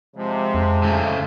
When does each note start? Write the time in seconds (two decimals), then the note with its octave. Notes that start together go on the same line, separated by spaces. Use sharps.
0.16 C3 F3 G#3
0.54 F2
0.83 C#3 A3